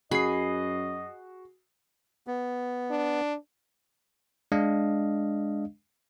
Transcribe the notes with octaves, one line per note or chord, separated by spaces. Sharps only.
F#2 F#4 G#4 D#5 B5 C7
B3
D4
G#3 D4 D#5 F5